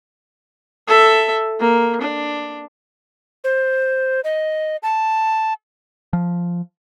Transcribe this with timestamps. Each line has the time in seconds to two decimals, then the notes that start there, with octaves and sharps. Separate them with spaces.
0.88 A4 E5
1.60 A#3
2.02 D4
3.44 C5
4.24 D#5
4.83 A5
6.13 F3